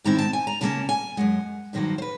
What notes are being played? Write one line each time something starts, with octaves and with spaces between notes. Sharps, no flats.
G#2 D#3 G#3 C4 E4 A#5
A5
G#5
A#5
C#3 F#3 A#3 C#4 A5
G#5
F#2 D#3 G#3 F#5
G2 D#3 F#3 A#3 C5
C5
B4